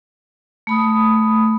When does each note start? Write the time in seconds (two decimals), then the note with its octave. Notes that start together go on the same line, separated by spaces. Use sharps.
0.67 A3 B5 D#6